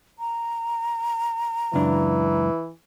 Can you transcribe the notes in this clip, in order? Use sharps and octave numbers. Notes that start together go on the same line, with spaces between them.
A#5
C#2 F#2 E3 D4